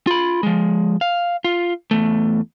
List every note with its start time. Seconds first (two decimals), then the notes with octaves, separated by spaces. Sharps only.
0.07 F4 B5
0.43 F3 G#3
1.01 F5
1.44 F4
1.91 E2 A3